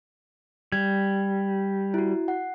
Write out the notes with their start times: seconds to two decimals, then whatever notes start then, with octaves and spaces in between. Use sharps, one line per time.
0.72 G3 G#6
1.94 E4 F#4
2.28 F#5